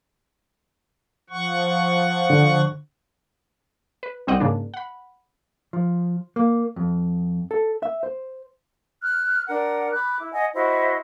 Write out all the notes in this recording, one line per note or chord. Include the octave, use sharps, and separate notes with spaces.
F3 F#5 C#6
D3
B4
C2 G3 C4 D#5 F#5 D6
G#2 C#3 A#3 D4
F#5 B5
F3
A#3
F2
A4
E5
C5
F6 F#6
D4 A#4 F#5
B5 D6 F#6
E4
D#5 F#5 G#5
E4 F#4 C5 D#5